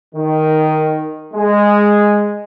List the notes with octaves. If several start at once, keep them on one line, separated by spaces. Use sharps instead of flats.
D#3
G#3